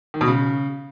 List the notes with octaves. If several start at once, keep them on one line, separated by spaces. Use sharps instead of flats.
D#3
B2
C#3